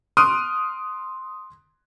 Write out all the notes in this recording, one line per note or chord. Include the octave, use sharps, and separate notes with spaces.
C6 D#6 F6 F#6 D7 D#7